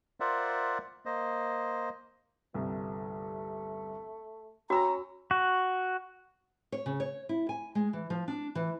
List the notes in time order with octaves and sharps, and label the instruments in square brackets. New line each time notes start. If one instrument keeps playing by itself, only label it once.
[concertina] F4 A#4 C5 D5 E5 F#5
A#3 C5 D#5
[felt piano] G1 C2 [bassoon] A3
[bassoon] C#4 [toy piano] F#4 [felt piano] G5 E6 A#6 [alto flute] A#5
[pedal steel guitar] F#4
[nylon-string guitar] C#5
C#3
C#5
E4
G#5
G#3
E3
F3
D4
E3